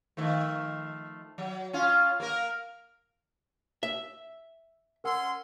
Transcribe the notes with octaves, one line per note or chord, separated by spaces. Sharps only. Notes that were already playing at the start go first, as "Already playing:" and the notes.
D#3 F3 A3
F#3
C#4 F4
A#3 A#4
E5
C#4 A#4 F#5 C6 E6